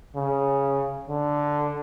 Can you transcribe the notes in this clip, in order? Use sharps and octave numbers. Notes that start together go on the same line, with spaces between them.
C#3
D3